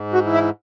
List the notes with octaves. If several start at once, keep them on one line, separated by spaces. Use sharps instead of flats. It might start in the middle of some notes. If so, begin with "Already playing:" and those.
Already playing: G#2
F#4
E3
E4